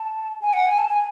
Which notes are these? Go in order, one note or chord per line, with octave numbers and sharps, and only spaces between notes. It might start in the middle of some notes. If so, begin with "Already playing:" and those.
Already playing: A5
G#5
F#5
G#5
A5
G#5